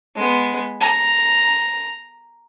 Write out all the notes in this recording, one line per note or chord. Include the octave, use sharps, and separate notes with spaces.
G#3 B3
A#5